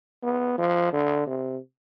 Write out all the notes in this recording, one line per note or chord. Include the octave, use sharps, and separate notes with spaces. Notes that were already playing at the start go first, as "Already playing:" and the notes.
B3
F3
D3
C3